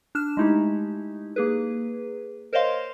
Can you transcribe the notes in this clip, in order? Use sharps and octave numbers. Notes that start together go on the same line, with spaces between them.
D4 F6 E7
G#3 A3 D#4 E4 G4
A#3 G#4 B4
A#4 C5 C#5 D#5 F5 C6